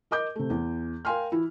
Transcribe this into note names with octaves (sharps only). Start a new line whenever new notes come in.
A#4 D#5 D6 G6
C3 A3
E2
A#4 F5 G5 G#5 C6 F6
E3 E4